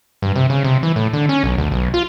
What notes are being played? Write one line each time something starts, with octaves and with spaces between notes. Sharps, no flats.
G2
C3
C#3
C3
E3
A2
D3
C#4
B1
D2
B1
F4